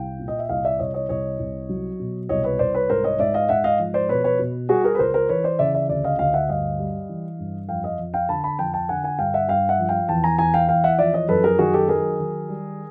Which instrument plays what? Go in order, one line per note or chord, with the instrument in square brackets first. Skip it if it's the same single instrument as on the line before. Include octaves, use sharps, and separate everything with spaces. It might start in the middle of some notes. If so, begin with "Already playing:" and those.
Already playing: [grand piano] C2 F5 G5
A#2
D#5
E5
C2 D#5 F5
D5 E5
C2 C#5 D#5
C#5 D#5
C2 C#5 D#5
C2
F#3
B2
C2 C#5 D#5
B4 C#5
C2 C5 D5
B4 C#5
G#2 A#4 C5
C#5 D#5
G#2 D5 E5
D#5 F5
G#2 E5 F#5
D#5 F5
F3
C5 D5
B2 B4 C#5
B4 C#5
B2
G3 F#4 G#4
G#4 A#4
B4
C#2 A#4 C5
A#4 C5
E3 B4 C#5
C5 D5
C#3 D5 E5
D5 E5
D2 D5 E5
D#5 F5
D2 D#5 F5
E5 F#5
G2 D#5 F5
G3
E3
G2
F2 F5 G5
D#5 F5
F2
F5 G5
D3 A5 B5
A5 B5
F2 G5 A5
G5 A5
D3 F#5 G#5
F#5 G#5
G2 F5 G5
E5 F#5
G2 F5 G5
E5 F#5
F3
F5 G5
E2 G5 A5
G#5 A#5
E2 G#5 A#5
F5 G5
E2 F5 G5
E5 F#5
F3 D5 E5
C#5 D#5
F#2 A4 B4
G#4 A#4
D#3 F#4 G#4
G4 A4
F#3 G#4 A#4
D#3
G3